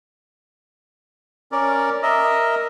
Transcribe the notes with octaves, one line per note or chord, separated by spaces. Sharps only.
C#4 A#4 D5
A#4 D#5 E5